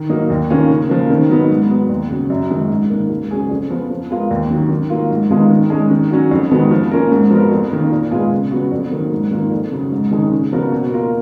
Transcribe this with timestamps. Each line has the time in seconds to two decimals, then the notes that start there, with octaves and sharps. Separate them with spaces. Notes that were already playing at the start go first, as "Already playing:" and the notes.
Already playing: D#3
0.09 F#3 A#3 D#4
0.30 D#2
0.50 D#3 A#3 C#4 F4
0.70 C#3
0.89 F3 A#3
1.10 D#3
1.30 F#3 B3 D#4
1.50 G#2
1.70 F#3 B3
1.89 D#2
2.09 C#3 F#3
2.30 F#2
2.50 D#3 G#3 D#4
2.69 G#2
2.90 D#3 A#3
3.10 C#2
3.31 C#3 F#3 C#4 G#4
3.50 F2
3.70 F3 B3
3.90 F3
4.10 G#3 B3 F4 A#4
4.31 D#2
4.50 D#3 F#3
4.70 D#3
4.90 F#3 A#3 F4
5.10 G#2
5.30 D#3 G#3 B3 F4
5.50 D#3
5.70 G#3 C#4
5.91 D#3
6.11 F#3 C#4 F#4
6.31 F2
6.51 D#3 G#3 B3 F#4
6.71 F3
6.91 A#3 C#4 F4 A#4
7.12 G#2
7.31 F3 B3 F#4 A#4
7.52 F2
7.71 D#3 A#3
7.92 A#2
8.11 G#3 B3 F4 G#4
8.32 C#3
8.51 F#3 B3 F#4
8.72 F2
8.91 D#3 F#3 A#3
9.11 G#2
9.31 D#3 A#3 F4
9.51 F2
9.72 C#3 F#3
9.92 G#2
10.11 D#3 G#3 C#4
10.31 C#3
10.52 F3 B3 F#4 A#4
10.72 B2
10.91 A#3 F4 A#4